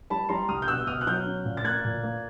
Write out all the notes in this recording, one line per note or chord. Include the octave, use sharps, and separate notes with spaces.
G3 A5 B5
G3 A#5 C6
C2 D#6 F6
G6
B2 E6 F#6
B2 D#6 F6
F#6
F#3 F6 G6
C#4
A#2
A6
A#3 F#6 G#6
A#2
A#3